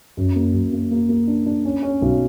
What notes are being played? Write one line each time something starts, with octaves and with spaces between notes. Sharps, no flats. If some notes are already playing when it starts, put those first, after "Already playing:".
F#2
A#3
F#2
A#3
A#3
A#3
D4
D4
C#4
C#4
B1